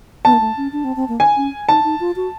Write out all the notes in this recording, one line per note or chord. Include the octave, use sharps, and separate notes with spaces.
B3 A5
A#3
A3
C#4
D4
C4
C4
A#3
G#5
C#4
D#4 A5
D#4
F4
F#4